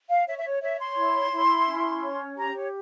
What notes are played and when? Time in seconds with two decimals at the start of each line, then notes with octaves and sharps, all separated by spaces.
0.09 F5
0.27 C#5 E5
0.38 E5
0.44 C#5
0.61 C#5 E5
0.80 C6
0.97 E4
1.32 E4
1.67 C#4
2.02 C#5
2.37 G4 A#5
2.54 C#5